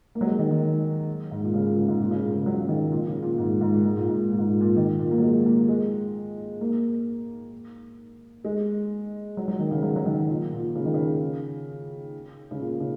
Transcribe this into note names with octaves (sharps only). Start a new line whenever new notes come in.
A#3
F#3
G#3
D#3
D#3
G#2
A#2
C#3
A#2
C#3
G#2
A#2
C#3
A#2
C#3
F#3
C#3
D#3
A#2
C#3
A#2
G#2
A#2
G#2
A#2
G#2
A#2
G#2
A#2
G#2
A#2
A#2
D#3
A#2
A#3
F#3
G#3
A#3
G#3
A#3
G#3
F#3
F#3
D#3
C#3
F#3
F#3
D#3
A#2
A#2
C#3
D#3
C#3
C#3
A#2
C#3